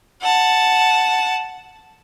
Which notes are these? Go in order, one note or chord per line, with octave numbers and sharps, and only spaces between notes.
F#5 A5